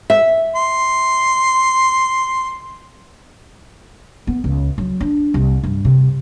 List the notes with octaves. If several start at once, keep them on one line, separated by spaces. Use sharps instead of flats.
E5
C6
B3
C#2
F#3
D4
C2
G2
C3